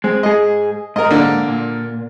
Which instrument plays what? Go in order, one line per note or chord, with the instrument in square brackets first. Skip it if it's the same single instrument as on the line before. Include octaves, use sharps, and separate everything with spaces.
[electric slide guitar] G#3 [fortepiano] C4
[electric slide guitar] G#2 G#4 [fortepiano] D#5
[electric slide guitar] G#2 [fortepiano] A#4 D#5
[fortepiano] D3 A#3 D4
[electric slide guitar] A#2